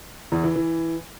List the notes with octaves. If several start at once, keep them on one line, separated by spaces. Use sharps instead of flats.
E2
E3
E3